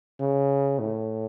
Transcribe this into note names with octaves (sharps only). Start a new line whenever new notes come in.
C#3
A2